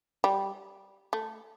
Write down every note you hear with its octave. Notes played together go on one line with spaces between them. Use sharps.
G3
A3